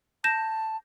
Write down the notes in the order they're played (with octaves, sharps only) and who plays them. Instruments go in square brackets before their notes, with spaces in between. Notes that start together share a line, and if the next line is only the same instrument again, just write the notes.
[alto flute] A5 [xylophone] G6 A#6 E7